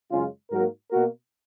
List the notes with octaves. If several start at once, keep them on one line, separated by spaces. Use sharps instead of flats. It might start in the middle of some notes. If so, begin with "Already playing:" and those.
F#2 C#3 G#3 C#4 F4
G#2 F#3 A#3 F#4 A#4
B2 A#3 F#4 A#4